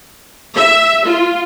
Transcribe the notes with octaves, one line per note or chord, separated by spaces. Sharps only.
E5
F4